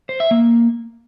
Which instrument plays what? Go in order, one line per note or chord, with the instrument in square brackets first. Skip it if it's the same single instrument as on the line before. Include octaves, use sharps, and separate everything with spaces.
[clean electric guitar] C5
E5
A#3